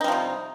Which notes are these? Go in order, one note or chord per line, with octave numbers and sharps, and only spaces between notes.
C3 F3 G3 D#4